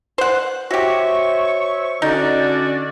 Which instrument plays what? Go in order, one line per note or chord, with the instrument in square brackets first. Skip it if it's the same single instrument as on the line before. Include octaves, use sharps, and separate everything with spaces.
[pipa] C5 F#5
[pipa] F#4 G4 [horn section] C5 E5 [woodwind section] C#5 C#6
[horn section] D3 [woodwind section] C#4 F#4 D5 [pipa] D#4